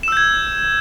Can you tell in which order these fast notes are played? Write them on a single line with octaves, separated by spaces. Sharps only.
E7 E6 G6 G#6